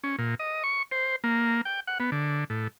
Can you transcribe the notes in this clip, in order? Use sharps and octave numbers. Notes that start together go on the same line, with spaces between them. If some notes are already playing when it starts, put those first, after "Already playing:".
C#4
A#2
D#5
C#6
C5
A#3
G5
F#5
B3
D3
A2